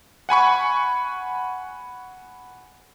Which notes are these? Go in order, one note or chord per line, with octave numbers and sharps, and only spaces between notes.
F#5 G#5 B5 C#6